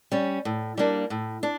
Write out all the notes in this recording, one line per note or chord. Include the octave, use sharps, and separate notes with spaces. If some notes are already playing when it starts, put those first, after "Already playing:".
G3 C#4
A2
G3 A#3 D4
A2
D4